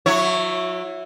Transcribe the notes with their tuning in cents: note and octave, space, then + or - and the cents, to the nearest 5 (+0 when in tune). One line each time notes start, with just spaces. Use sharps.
F#3 -30 E4 +0 C#5 +0